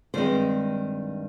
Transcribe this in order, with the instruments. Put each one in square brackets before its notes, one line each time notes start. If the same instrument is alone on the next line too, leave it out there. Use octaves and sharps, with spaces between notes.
[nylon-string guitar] G2 D#3 G#3 C4 C5